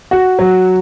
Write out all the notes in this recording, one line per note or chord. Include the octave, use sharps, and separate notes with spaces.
F#4
F#3